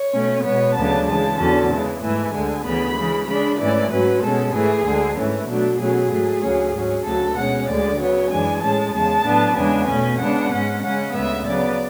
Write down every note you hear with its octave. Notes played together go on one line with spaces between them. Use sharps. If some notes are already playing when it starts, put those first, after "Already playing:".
Already playing: C#5
B2 A3 C#4
B2 G#3 B3 C#5
D2 C#3 F#3 B3 D4 A5
C#3 E3 G#3 A5
E2 D3 F#3 C#4
C#3 E3 G#3
G#2 E3 A3 G#5
D2 D3 G#3
D2 C#3 E3 B3 B5
C#3 E3 G#3
C#3 G#3 D4 B5
G#2 E3 A3 C#4 D5
G#2 F#3 C#4 B4
B2 G#3 C#4 A4
G#2 E3 A3 G#4
D2 D3 G#3
G#2 E3 A3 C#4
B2 F#3 A3 D4
B2 F#3 A3 C#4 G#4
G#2 F#3 A3
D2 C#3 F#3 C#4
G#2 F#3 C#4
D2 C#3 F#3 A4
B2 G#3 C#4 F#5
D2 D3 G#3 D5
C#3 F#3 B3 C#5
F#2 E3 G#3 D4 G#5
A2 G#3 C#4 A5
E2 C#3 G#3 A5
A2 F#3 B3 D4
E2 C#3 G#3 B3 D4 G#5
B2 A3 C#4
C#3 G#3 B3 D4 F#5
G#2 G#3 C#4
C#3 G#3 C#4 F#5
D2 C#3 G#3 B3 E5
C#3 F#3 B3 D5